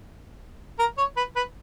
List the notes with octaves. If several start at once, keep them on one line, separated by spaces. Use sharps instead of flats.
A#4
C#5
B4
B4